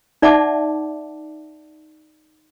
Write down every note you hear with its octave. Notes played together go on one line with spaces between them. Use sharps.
D#4 D5 E5 F#5 A5 D6